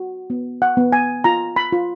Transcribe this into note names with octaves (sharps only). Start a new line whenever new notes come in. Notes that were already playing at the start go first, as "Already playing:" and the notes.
Already playing: F#4
B3
F#5
B3
G#5
F4 A#5
B5
F4